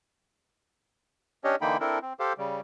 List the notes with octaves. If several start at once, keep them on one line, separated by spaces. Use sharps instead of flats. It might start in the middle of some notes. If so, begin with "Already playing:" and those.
C#4 D4 G4 C#5 D#5
D3 E3 A#3 D#4 G5 B5
C4 D4 E4 A4 A#4
C4
G4 A4 C5 F5
C#3 G3